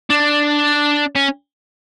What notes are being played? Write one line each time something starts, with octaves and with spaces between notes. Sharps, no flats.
D4
C#4